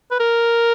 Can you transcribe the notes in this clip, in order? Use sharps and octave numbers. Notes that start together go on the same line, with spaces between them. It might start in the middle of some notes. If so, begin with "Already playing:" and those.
B4
A#4